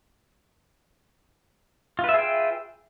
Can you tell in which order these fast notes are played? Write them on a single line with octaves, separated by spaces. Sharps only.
F4 B4 E5 G#4 G5